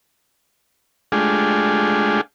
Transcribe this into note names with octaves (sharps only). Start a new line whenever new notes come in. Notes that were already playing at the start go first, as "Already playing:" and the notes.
G#3 A3 D4 F4 G4 G#4